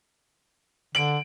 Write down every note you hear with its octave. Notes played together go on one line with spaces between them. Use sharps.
D3 D7 F#7